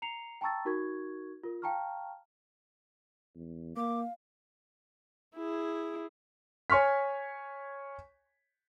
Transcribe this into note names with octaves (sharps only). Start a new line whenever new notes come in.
A#5 C7 C#7 F7
G5 A5 A#5 C#6 E6 A6
D#4 F#4 A#4 C#6 G#6
F4 A#4
F5 G5 A5 A#5 C#6 F6
E2
A#3 F5 D6
E4 G#4
C#5 G#5 C#6 F6 B6